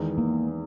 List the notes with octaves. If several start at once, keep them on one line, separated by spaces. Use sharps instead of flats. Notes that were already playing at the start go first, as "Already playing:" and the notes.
Already playing: E2 D#3 G#3 B3
A#3